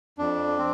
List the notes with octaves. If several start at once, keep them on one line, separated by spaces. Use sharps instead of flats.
F2 D4
C4